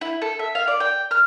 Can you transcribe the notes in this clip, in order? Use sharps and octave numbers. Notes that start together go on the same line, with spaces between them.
E4
A4
E5
F5
D5
G5
F6